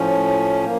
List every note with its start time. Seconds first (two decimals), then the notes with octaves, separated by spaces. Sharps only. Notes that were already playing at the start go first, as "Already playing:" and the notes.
Already playing: A2 F3 C#4
0.63 A#3